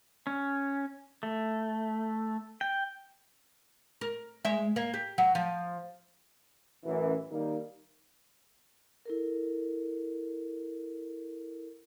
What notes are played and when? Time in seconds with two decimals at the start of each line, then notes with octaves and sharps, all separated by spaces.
0.27 C#4
1.23 A3
2.61 G5
4.01 A#4
4.45 G#3 E5
4.76 A#3
4.94 G4
5.18 F#3
5.35 F3
6.84 A1 F#2 E3
7.30 D#3 G3 A#3 D#4
9.05 E4 A4 A#4